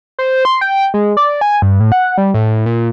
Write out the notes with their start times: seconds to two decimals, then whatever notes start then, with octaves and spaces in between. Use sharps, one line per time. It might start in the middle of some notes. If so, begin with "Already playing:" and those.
0.19 C5
0.45 C6
0.61 G5
0.94 G#3
1.17 D5
1.41 G#5
1.62 G2
1.80 A2
1.92 F#5
2.18 G3
2.34 A2
2.66 A#2